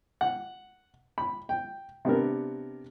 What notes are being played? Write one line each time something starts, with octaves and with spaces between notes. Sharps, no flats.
F#5
B5
G5
C3 B3 D4 A#4